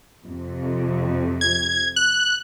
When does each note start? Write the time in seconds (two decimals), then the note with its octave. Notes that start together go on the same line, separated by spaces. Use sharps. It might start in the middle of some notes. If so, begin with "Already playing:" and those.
0.25 F2 C3
1.41 G#6
1.96 F#6